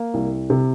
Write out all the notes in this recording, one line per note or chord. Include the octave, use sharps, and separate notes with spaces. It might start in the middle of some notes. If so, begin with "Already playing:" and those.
Already playing: A#3
C2
C3